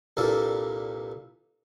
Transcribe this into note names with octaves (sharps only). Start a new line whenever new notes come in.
C2 G2 A#2 A#3 A4 D5